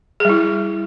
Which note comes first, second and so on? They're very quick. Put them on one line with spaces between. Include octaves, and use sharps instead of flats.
G#4 G3 E4